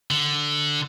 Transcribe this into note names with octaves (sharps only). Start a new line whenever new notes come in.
D3